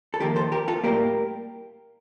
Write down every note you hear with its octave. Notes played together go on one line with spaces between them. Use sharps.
A4
F2 C3 D#3 A#3 G4 A#4
A4 C5
G4 A#4
F4 A4
A2 G3 A#3 G4 A#4